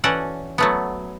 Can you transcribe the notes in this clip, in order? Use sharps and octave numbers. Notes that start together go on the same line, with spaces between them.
E3 C#4 F#4 A4 D5 F#5
F#3 A3 B3